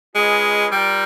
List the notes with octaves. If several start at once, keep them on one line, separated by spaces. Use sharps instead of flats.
G#3 C#4 F4 G#4 B4 D#5
G3 F4 A#4 D5 G5